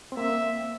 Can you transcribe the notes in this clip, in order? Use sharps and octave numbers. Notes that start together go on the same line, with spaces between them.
C4
A#3 E5